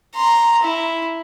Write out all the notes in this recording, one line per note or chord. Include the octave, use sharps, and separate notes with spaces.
A#5 C6
E4